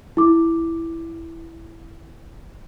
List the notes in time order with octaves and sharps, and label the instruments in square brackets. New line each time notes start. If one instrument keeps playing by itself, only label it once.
[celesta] E4 D6